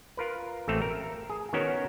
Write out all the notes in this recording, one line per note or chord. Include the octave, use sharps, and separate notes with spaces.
F4 A#4 B4
A1 A3 C4 A4 A#5
A#4
G#4
D#3 B3 C#4 F#4 A#4 C#5